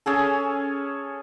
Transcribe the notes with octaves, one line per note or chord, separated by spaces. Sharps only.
C#4 G#4 A4